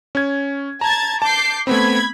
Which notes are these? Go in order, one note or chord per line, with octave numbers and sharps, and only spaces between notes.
C#4 G#6
A5 A#5 G#6 A6
A5 D6 G6 C7
A3 B3 C4 B5 G#6